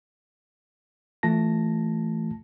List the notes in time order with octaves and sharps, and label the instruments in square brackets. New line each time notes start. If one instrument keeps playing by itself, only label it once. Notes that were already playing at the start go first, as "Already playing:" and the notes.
[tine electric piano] E3 A3 F4 A5 A#6